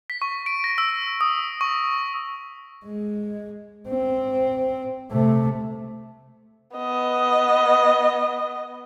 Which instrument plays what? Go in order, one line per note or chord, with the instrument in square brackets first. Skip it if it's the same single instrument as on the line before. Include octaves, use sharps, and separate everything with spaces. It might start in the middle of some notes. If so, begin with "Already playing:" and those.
[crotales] B6
C#6
D7
A#6
E6
D#6
C#6
[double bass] G#3
C4
C3 A3
[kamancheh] B3 D#5